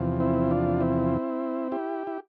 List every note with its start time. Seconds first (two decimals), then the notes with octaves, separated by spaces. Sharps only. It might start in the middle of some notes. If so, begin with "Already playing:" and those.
Already playing: E2 C3 F3
0.20 C4 E4
0.51 D4 F4
0.81 C4 E4
1.72 E4 G4
2.07 E4